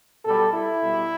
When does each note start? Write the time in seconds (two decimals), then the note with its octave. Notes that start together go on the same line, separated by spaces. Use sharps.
0.25 B2 G3 A4
0.54 E4
0.83 B2 G3